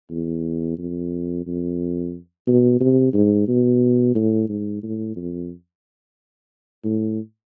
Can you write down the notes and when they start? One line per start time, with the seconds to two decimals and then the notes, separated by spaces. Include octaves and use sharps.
0.11 E2
0.78 F2
1.46 F2
2.47 B2
2.80 C3
3.14 G#2
3.48 B2
4.15 A2
4.49 G#2
4.83 A2
5.16 F2
6.84 A2